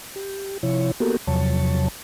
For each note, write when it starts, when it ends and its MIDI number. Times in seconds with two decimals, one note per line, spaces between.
0.16 0.58 67
0.63 0.91 48
0.63 0.91 53
0.63 0.91 64
0.63 0.91 73
1.00 1.17 58
1.00 1.17 59
1.00 1.17 66
1.00 1.17 67
1.00 1.17 69
1.00 1.17 70
1.27 1.88 40
1.27 1.88 48
1.27 1.88 53
1.27 1.88 54
1.27 1.88 73
1.27 1.88 81